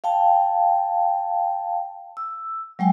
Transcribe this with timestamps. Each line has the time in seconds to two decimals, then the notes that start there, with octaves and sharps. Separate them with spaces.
0.04 F5 G5 A5
2.17 E6
2.79 F#3 G#3 G5 G#5